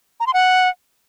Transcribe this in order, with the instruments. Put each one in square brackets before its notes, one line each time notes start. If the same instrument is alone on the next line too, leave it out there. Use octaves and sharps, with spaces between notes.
[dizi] A#5
C6
F#5